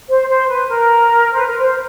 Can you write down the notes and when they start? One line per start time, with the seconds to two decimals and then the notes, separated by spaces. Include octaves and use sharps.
0.09 C5
0.28 C5
0.47 B4
0.68 A#4
1.32 C5
1.39 B4
1.47 A#4
1.60 C5